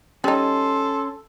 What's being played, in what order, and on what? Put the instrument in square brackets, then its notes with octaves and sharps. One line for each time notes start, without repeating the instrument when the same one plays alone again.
[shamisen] G3 D#4 [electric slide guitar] C#4 [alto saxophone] A4 [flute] C6